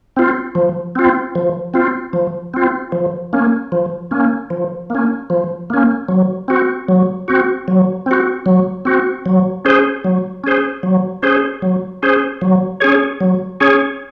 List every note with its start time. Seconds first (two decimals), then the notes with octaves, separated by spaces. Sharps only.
0.17 C4 F4
0.55 F3
0.95 C4 F4
1.35 F3
1.74 C4 F4
2.13 F3
2.54 C4 F4
2.92 F3
3.33 A#3 C#4
3.72 F3
4.11 A#3 C#4
4.50 F3
4.90 A#3 C#4
5.30 F3
5.70 A#3 C#4
6.08 F#3
6.48 C4 F#4
6.88 F#3
7.28 C4 F#4
7.68 F#3
8.06 C4 F#4
8.46 F#3
8.85 C4 F#4
9.26 F#3
9.65 C#4 G#4 C5
10.04 F#3
10.44 C#4 G#4 C5
10.83 F#3
11.23 C#4 G#4 C5
11.62 F#3
12.03 C#4 G#4 C5
12.42 F#3
12.80 C#4 G#4 C#5
13.20 F#3
13.60 C#4 G#4 C#5